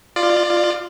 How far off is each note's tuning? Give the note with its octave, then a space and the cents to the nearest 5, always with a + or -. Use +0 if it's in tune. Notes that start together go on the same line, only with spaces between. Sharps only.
F4 +0 D5 +25